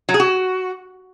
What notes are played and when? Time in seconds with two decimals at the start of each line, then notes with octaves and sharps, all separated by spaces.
0.09 F#3
0.14 G#4
0.20 F#4